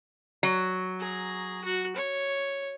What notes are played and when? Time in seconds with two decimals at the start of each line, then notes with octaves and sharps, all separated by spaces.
0.43 F#3
0.99 G#4 A#5
1.64 F#4
1.96 C#5